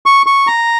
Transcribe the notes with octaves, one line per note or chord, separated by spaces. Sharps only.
C#6
C#6
A#5